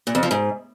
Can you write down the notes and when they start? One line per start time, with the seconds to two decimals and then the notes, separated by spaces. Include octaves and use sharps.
0.07 A#2
0.15 F2
0.23 F3
0.31 G#2